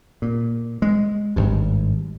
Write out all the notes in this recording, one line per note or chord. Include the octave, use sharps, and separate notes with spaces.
A#2
G#3
G#1 G2